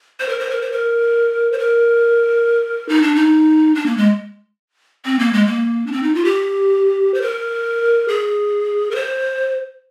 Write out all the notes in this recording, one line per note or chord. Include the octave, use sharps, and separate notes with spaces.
C5
A#4
C5
A#4
C5
A#4
C5
A#4
D#4
D4
D#4
D4
A#3
G#3
C4
A#3
G#3
A#3
D4
C4
D#4
F4
G4
C5
A#4
G#4
A#4
C5